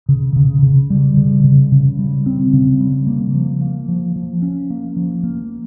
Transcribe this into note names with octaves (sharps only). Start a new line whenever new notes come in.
C#3
C#3
C#3
G3
C#3
C#3
C#3
G3
C4
C#3
G3
A#3
F3
A#3
F3
F3
C#4
A#3
F3
A#3